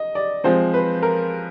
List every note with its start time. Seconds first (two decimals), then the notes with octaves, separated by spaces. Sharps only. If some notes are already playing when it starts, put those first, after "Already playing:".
Already playing: D#5
0.15 D5
0.44 F3 G#3 C4 C5
0.74 B4
1.02 A#4